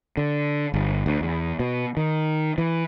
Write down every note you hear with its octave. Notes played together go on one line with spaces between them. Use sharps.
D3
G1
D2
E2
B2
D#3
E3